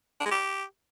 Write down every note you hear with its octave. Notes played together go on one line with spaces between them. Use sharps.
D4
G#3
G4